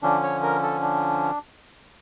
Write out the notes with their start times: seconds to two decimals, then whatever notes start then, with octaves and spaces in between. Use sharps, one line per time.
0.03 D3 F3 C#4 D4
0.23 C#5
0.43 A#4
0.63 A4
0.83 D4